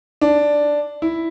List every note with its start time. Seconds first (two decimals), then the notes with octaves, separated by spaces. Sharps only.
0.21 D4
1.02 E4